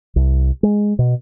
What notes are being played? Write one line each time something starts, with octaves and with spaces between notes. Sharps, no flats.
C2
G#3
B2